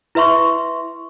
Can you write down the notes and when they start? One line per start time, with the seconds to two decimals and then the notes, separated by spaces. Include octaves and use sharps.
0.15 E4 B4 E5 C6 C#6